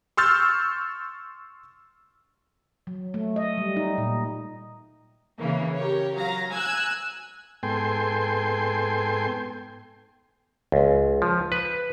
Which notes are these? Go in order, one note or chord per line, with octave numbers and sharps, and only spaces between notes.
C6 C#6 E6 F6 G6 A6
F#3
A3
D#5
G3
D#4
A#2
C#3 E3 A#3
G4 A#4 C#5
F#3 F5 A#5 A#6
G#5 E6 F#6 G#6
G#2 B3 A4 G5 G#5 C6
C#2
F3
B4